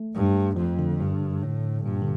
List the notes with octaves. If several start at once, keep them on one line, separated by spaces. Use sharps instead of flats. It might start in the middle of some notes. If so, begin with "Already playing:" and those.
Already playing: A3
G2
F2 F3
D3
G2
A2
G2 A#2
D3